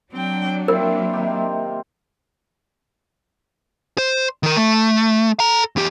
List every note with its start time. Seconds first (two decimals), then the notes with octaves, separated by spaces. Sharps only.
0.13 F#3 C4 D4 G5
0.68 A#3 C4 E4 F4 A#4
1.13 C3 D#3 G4
3.98 C5
4.43 D#3 A#4
4.56 A3
5.40 A4 A#5
5.76 E2 G4